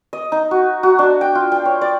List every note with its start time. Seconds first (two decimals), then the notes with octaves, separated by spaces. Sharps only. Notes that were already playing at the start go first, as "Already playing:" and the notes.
0.13 D#5
0.32 D#4
0.51 F#4
0.83 F#4
0.99 D4
1.21 G5
1.35 F4
1.52 G5
1.65 C#5
1.81 D5